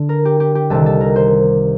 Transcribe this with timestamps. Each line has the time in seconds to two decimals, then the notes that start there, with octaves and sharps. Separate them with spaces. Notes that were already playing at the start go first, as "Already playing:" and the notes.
Already playing: D3 D4
0.09 A#4
0.25 G4
0.40 G4
0.55 G4
0.70 C2 C3 D#3 A4
0.86 A4
1.01 A#4
1.16 C5